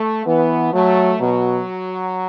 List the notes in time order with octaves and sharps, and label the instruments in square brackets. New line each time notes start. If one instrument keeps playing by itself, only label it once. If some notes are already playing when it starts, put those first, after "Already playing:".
Already playing: [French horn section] A3
[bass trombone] E3 [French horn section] B3
[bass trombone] F#3 [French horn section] A3
[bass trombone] B2 [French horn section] F#3